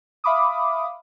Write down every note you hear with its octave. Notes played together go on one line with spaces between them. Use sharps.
E5 F5 B5 D6 D#6